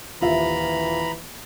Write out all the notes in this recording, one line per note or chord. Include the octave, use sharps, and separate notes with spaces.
D#1 E3 F4 E5 A#5 B5